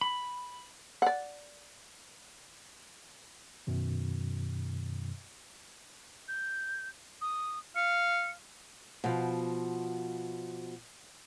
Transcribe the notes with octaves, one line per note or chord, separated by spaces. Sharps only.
B5
D5 F#5
F#2 B2 D#3
G6
D#6
F5 C#7
B2 F3